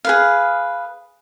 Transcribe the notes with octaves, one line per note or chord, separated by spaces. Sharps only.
G#4 B4 F5